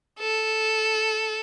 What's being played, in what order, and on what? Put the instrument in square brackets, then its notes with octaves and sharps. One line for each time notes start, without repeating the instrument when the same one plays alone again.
[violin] A4